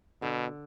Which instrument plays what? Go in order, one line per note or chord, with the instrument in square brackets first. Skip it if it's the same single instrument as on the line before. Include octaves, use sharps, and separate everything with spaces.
[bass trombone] B2 [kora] D3